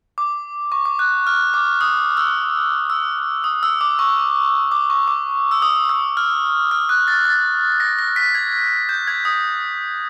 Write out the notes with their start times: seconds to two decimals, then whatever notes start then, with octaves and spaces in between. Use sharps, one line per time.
0.18 D6
0.72 C#6
0.85 D6
0.99 F#6
1.27 F6
1.54 D6
1.81 D#6
2.17 E6
2.90 E6
3.44 D#6
3.63 E6
3.81 D6
3.99 C#6
4.72 D6
4.90 C#6
5.08 D6
5.51 E6
5.62 D#6
5.89 E6
6.17 F6
6.71 F6
6.89 F#6
7.08 A6
7.26 A6
7.80 A#6
7.99 A#6
8.16 B6
8.35 G#6
8.89 G6
9.07 G#6
9.25 D#6